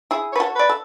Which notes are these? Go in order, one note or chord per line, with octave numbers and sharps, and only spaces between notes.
E4 G#4
B4 C#5
F#4 A4
B4 D5
A4